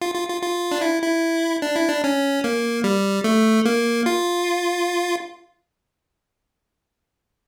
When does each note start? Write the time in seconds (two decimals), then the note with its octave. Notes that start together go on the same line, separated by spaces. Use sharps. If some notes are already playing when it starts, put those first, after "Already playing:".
0.02 F4
0.15 F4
0.29 F4
0.42 F4
0.72 D4
0.81 E4
1.02 E4
1.62 D4
1.76 E4
1.89 D4
2.04 C#4
2.44 A#3
2.84 G3
3.24 A3
3.65 A#3
4.06 F4